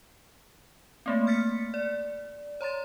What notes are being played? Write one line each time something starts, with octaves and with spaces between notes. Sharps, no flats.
A3 A#3 C4
F6 A6 B6 C#7
D5
C#5 A#5 C6 A6